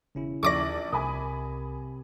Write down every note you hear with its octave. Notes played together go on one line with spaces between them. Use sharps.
E1 C#3 C#4 E4
A#1 D#2 D5 C#6 D6 A#6
C2 C3 A#4 G#5 B5 D#6